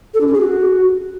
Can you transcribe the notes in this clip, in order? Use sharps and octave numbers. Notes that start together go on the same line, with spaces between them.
A4
D4
C#4
G#4
F#4